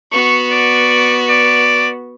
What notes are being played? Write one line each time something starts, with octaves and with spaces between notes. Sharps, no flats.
B3 F#4 C#6
D5
D5